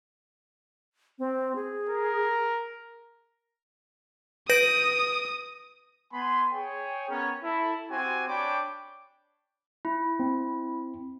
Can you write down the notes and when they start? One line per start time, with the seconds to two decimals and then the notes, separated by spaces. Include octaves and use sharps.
1.19 C4
1.55 G#4
1.90 A#4
4.50 B4 D#6 A#6 D7
6.13 B3 G#5 B5 C6
6.53 G#4 C#5 G5
7.10 B3 C#4 A#4 C#5
7.43 E4 A4
7.90 C4 F#4 G4 G#5
8.28 D4 C#5 G5 B5 D6
9.85 E4
10.20 C4